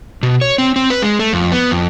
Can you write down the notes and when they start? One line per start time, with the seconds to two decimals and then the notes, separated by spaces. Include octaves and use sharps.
0.23 B2
0.41 C#5
0.58 C4
0.76 C4
0.90 B4
1.02 G#3
1.19 A3
1.33 F2
1.52 B3
1.71 F2